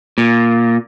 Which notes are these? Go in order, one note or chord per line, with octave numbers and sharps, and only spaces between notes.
A#2